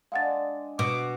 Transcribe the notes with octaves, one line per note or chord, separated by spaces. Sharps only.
G#3 D4 F5 F#5 A6
B2 D6